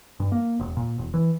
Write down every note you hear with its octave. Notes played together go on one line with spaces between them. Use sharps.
G2
A#3
E1
A#2
E1
E3